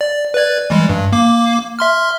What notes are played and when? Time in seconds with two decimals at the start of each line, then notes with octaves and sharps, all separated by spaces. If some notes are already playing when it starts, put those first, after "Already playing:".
0.01 D5
0.34 B4 D5 G#6
0.70 E3 G3 G#3
0.89 G2
1.12 A#3 D6
1.79 E5 C6 F6